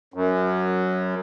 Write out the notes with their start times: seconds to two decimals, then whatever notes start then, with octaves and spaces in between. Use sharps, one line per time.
0.14 F#2